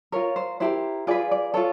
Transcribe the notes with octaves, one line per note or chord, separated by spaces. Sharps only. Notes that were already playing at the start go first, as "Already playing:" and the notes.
F4 A#4 C#5
C5
E4 G4 A#4 C5
F4 G#4 B4 D5
D5
F4 A4 C#5